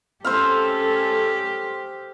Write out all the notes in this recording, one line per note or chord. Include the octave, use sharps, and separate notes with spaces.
A3 C#4 G4 A4 C5 E5 F5